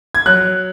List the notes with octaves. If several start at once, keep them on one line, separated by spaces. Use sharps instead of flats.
G#6
F#3 F#6